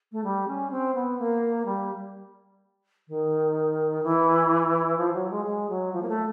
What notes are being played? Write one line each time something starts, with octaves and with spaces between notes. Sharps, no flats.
A3
G3
C#4
C4
B3
A#3
G3
D#3
E3
F3
F#3
G#3
G#3
F#3
F3
A#3
A3